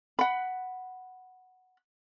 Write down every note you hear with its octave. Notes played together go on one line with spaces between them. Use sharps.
F#5 B5